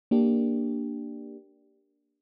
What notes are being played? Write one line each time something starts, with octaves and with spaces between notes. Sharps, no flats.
A#3 D4 G4